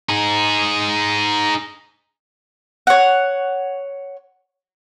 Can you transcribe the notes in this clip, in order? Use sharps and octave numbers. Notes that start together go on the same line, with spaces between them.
D#4 G#4
C#5 F#5